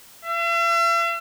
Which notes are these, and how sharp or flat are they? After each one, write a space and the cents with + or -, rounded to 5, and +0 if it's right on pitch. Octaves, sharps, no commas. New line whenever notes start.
E5 +45